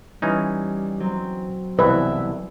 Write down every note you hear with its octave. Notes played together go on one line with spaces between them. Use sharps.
E3 G3 C#4 D#4
F#3 C4
C2 B2 E3 B4 E5